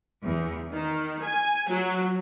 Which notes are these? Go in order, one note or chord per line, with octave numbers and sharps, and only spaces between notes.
E2
D#3
G#5
F#3